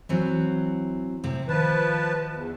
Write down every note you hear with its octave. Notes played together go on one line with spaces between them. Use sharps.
E3 F#3 C4
A2 C3 C4
D#3 F3 B4 A5
E2